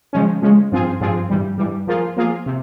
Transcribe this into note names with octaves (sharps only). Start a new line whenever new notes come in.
C#3 F3 G#3 C#4
C#3 F3 G#3 C#4
G2 F3 C4 F4 G#4
G2 F3 C4 F4 G#4
G2 E3 G3
G2 E3 G3
F3 A#3 F4 G#4
F3 A#3 F4 G#4
C3